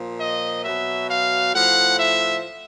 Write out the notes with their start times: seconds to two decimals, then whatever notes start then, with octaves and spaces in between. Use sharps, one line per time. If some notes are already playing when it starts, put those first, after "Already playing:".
Already playing: A#2 F3
0.20 D#5
0.64 B2 F#3 E5
1.09 F5
1.54 A2 F3 F#5
1.98 E5